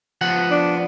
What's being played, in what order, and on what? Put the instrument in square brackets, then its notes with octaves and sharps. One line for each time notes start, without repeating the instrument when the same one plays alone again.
[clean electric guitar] F3 B3 F#5
[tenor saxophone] D4